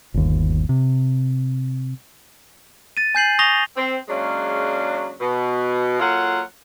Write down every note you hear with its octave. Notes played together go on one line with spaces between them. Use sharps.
G1 D#2
C3
A6 D#7
G#5 G6 C7 F#7
C#6 D#6 A#6 F7 G7
C4
C#3 F#3 G#3 A#3 C#4 D4
B2
F#3 A#3 F4 A4 F#5